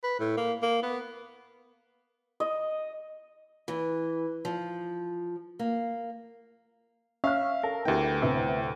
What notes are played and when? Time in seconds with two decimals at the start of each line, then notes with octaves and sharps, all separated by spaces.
0.03 B4
0.19 A2
0.37 A#3
0.62 A#3
0.82 B3
2.40 D#5
3.68 E3
4.45 F3
5.59 A#3
7.24 C#4 E5 F5 F6
7.63 A4 A#4
7.85 D2 B3 E4 G4 G5
8.22 A2 C3 B3 E5